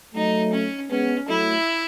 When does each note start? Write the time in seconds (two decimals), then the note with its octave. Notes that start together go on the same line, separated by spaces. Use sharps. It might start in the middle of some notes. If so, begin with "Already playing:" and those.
0.15 F#3 A3 D#4
0.53 C#4
0.90 G#3 B3 C#4
1.28 F#3 A3 E4